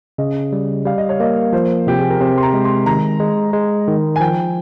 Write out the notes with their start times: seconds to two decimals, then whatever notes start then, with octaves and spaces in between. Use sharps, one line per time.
0.18 C#3 D#5
0.53 G3
0.85 G3 F5
0.98 D#5
1.09 C#5
1.20 A#3 D#5
1.53 F3 C5
1.87 C3 G4
1.98 G#4
2.10 A#4
2.21 C3 C5
2.38 C6
2.43 A#5
2.53 G#3
2.65 C6
2.86 D#3 A#5
3.20 G#3
3.53 G#3
3.88 D#3
4.16 G#5
4.20 F3 G5